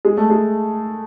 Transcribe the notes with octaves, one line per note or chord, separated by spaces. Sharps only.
G#3
A3
G#3